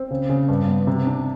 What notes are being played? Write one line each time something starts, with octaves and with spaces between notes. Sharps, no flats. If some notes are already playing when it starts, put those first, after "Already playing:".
Already playing: C4
C#3
C#3
G2
B3
C3
D4